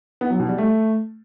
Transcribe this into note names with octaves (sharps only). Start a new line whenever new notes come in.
B3
F#3
B2
G3
A3